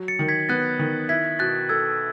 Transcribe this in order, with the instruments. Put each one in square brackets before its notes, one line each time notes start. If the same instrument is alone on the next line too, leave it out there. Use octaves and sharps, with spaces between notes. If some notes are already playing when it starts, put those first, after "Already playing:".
Already playing: [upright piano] F#3
[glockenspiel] A6 C#7
[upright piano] D#3
[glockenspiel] G#6 B6
[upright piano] B3 [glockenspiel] F#6 A6
[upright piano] D#3
[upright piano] E4 [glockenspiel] G#6 B6
[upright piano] B2 [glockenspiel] F#6 A6
[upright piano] A4 [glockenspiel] E6 G#6